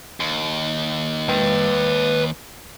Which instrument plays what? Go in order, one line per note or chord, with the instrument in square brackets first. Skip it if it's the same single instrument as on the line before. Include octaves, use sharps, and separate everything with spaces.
[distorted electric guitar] D#2
[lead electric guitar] B4 G5